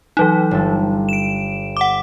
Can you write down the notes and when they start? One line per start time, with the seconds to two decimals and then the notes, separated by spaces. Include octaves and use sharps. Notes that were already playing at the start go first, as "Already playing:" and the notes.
0.17 E3 F#3 D#4
0.51 G1 A4
1.09 D7 E7
1.77 F#5 D6